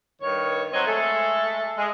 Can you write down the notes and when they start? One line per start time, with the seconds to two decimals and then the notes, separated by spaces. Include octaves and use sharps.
0.21 G2 D#3 C#5
0.73 F#3 C4 C5 C#5 D#5
0.87 G#3 A3 A4
1.78 G#3